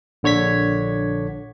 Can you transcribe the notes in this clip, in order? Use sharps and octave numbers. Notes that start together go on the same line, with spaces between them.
A#1 D3 C#5 G#6 B6